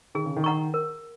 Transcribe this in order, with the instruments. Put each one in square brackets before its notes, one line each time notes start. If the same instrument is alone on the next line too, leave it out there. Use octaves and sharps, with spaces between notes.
[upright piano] D#3 [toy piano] G#4
[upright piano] C#3
D#3
[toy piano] F#5 A#5 C#6
A#4